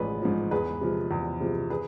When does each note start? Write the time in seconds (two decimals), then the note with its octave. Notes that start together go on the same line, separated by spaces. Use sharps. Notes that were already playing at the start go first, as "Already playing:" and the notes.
Already playing: A1 G#2 F3 G#4 B4
0.22 G#2 F3
0.51 E2 G#4 B4
0.81 C3 F3 G#3
1.11 E2
1.40 C3 F3 G#3
1.70 G#4 B4